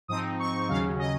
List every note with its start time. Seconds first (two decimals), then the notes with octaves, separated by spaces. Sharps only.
0.08 G#2 F3 C4 D#4 D#6
0.39 C#6
0.69 D#2 C#3 F#3 C#4 F5
0.99 D#5